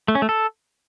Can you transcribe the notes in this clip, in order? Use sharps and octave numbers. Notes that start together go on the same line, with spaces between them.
A3
C#4
A3
A4